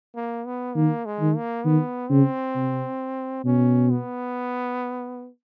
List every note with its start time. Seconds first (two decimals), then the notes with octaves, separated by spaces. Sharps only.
0.15 A#3
0.46 B3
0.76 D#3 A#3
1.06 G#3
1.21 D#3
1.36 A#3
1.66 D#3 B3
2.10 C#3 C4
2.56 C3
3.45 B2 C#4
3.90 B3